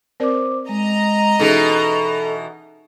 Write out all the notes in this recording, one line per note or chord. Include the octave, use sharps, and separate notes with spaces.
C4 A#4 C5 D5 D6
G#3 D#5 A#5
B2 E3 C#4 D#4 G#4 A4